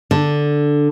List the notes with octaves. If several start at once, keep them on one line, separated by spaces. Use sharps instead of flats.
D3